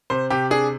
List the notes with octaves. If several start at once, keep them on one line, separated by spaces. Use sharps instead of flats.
C3 C5
C3 G4
D4 G#4